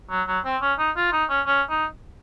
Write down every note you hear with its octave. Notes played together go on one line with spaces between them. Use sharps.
F#3
F#3
C4
C#4
D#4
F4
D#4
C#4
C#4
D#4